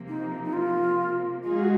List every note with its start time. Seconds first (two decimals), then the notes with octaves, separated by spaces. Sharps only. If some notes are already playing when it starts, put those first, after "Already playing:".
Already playing: C3 F3 A#3
0.08 D#4
0.44 D#4
0.53 F4
1.43 G#3 D#4 F4 G#4
1.59 F#4